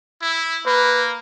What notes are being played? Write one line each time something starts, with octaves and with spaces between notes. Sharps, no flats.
E4
A#3 B4